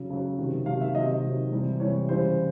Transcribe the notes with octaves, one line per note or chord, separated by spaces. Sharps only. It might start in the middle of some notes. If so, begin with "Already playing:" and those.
Already playing: C#3 F#3
C#3 F#3
C3 D#3 F#3
C3 D#3 F#3 F5
E5
C3 D#3 F#3 D#5
C3 D#3 F#3
C3 E3 G3
C3 E3 G3 C#5
C#3 E3 G3 C5